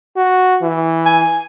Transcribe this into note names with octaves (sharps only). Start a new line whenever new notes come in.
F#4
E3
G#5